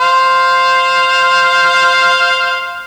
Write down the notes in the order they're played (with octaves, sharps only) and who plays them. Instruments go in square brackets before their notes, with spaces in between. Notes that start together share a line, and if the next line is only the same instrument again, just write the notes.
[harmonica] C5 F5